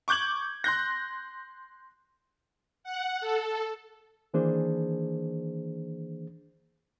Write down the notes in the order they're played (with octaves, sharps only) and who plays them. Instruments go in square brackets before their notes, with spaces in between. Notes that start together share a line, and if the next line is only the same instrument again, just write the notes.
[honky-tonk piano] C#6 D6 G6 G#6 F#7
C6 F#6 G6 A#6
[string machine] F#5
A4
[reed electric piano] D#3 E3 A#3 D4 G#4 C5